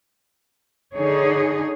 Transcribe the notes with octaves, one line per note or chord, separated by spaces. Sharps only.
D3 D#4 G#4 C#5